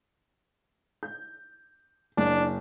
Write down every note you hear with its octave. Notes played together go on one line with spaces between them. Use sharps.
G6
F#1 D4